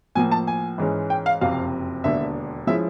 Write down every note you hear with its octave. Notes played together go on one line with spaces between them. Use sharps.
A2 F3 A#3 G#5
A5
G#5
G#2 E3 G#3 C#4
G5
F5
F#1 F2 C3 F5
E1 D#2 D3 E5
F3 G#3 C#4 E4 E5